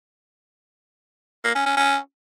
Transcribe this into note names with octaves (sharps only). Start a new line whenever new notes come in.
A#3
C#4
C#4
C#4